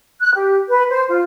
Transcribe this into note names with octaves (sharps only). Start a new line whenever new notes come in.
F#6
G4
B4
C5
F4